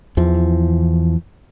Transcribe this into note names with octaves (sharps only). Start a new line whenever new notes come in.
E2 E3 F3